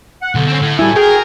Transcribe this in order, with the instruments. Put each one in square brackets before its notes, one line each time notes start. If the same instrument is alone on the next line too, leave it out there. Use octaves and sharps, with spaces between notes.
[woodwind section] F#5
[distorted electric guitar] B1 [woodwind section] D3
[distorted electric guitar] C4 C#4
A2
[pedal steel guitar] G3 E4 [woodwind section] F#4 A4 G#5
[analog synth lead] G#4 [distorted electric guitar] A#4 [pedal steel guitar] G5